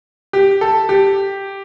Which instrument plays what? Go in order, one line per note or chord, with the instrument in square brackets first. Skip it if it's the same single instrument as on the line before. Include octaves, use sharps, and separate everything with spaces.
[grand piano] G4
A4
G4